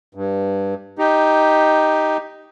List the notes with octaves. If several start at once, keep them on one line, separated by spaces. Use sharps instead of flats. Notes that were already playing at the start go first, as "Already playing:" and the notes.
G2
D#4 G4